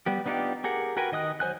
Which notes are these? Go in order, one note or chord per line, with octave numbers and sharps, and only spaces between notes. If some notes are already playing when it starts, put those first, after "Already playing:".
G3 B3 G4
B3 D4 D#4 F4 G4
G4 G#4 A#4 F#5
F#4 A#4 B4 G5 G#5
D#3 D#5 D#6 F#6
F#3 C5 G#5 F#6